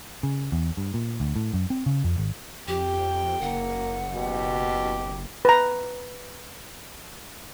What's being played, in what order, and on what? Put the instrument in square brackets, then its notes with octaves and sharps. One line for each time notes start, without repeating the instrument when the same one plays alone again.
[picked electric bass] C#3
E2
G2
A#2
D2
A2
F#2
C4
C#3
F2
G#1
[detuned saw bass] F2 [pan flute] G4 [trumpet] G5
[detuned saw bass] F#1 [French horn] A#3 [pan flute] F#5
[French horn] B2 [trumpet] G4
[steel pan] B4 A#5